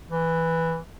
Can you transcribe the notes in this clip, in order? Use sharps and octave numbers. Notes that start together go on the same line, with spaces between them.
E3